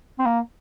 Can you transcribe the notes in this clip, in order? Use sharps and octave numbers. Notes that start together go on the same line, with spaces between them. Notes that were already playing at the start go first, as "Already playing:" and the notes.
C4
A#3